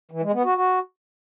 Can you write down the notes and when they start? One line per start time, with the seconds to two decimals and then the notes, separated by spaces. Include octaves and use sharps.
0.11 E3
0.22 G#3
0.33 B3
0.44 F#4
0.55 F#4